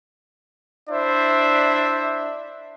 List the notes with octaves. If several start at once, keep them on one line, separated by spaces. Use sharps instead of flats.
D4 E4 C5 D5 E5